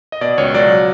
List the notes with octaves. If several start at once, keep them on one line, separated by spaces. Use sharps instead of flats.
D#5
B2 D5
C#2 C#5
F#3 D5